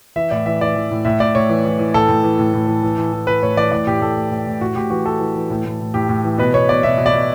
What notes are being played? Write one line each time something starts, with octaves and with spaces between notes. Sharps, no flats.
E3 E5
A2 D5
E3 E5
E3 D5
E3
A2
A2 E5
A2 D5
A2 C#5
E3
E3
E3
A2 A4
A2
E3
A2
A2
E3
E3
E3
E3
E3 B4
A2 C#5
E3 D5
A2 D5
A2 G4
A2 A4
A2
A2
A2
A2 F#4
A2 G4
E3 F#4
E3 A4
E3
E3
A2
A2
A2
A2 G4
A2
E3
B2 B4
B2 C#5
B2 D5
B2 E5
B2
D5
B2